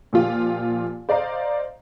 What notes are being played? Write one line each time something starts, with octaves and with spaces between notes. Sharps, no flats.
A#2 F3 F4 G4
C5 D5 D#5 F5 A#5